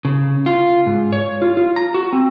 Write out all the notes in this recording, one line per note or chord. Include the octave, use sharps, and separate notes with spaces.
C#3
F4
G#2
C#5
F4
F4
A#5
F#4
C4